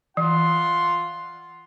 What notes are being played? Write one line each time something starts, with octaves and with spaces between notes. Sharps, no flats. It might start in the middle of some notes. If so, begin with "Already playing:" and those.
E3 F4 F#5 C6